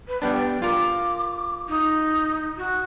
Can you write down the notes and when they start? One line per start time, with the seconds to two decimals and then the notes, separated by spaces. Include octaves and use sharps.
0.08 B4
0.22 G3 B3 D4 G5
0.62 F4 A#4 D6
1.69 D#4
2.57 F#4